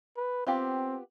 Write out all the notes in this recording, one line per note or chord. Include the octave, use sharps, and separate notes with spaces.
B4
B3 C4 F4 G4